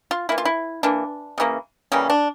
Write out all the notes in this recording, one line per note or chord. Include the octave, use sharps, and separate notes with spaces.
F4
E3 A#3 E4
F4
E4
E3 A#3 D4
C#3 E3 G3 A#3
C#3 E3 G3 A#3 C#4
D4